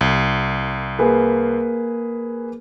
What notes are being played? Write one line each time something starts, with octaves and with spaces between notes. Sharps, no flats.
C2
A#3 G#4 B4